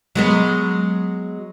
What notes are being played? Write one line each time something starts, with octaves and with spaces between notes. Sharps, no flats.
F#3 G#3 B3